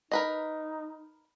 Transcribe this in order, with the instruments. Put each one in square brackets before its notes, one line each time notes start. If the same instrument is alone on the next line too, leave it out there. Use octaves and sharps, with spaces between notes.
[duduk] D#4 [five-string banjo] A#4 B4 D#5